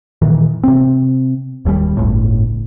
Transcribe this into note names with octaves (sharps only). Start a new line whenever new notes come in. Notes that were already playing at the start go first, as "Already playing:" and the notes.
A#2 D#3 E3
C3 C4
D1 D#2 D3 G3
G1 C#2 A2